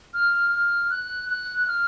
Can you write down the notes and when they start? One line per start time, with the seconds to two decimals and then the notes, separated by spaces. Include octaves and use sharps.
0.14 F6
0.52 F6
0.90 F#6
1.29 F#6
1.68 F6